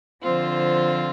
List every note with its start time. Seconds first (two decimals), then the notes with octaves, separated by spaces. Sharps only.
0.22 D3 F3 C4 F4 C5